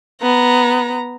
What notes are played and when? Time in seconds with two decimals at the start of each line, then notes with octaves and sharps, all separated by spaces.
0.22 B3 A#5